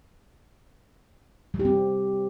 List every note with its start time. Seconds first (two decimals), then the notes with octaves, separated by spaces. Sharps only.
1.54 G3
1.59 G4
1.65 C4